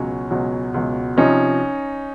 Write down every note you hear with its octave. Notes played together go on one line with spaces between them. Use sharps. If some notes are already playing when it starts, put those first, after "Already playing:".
Already playing: C#2 B2 F#3 C#4
C#2 B2 F#3
C#2 B2 F#3
C3 F3 C#4 D#4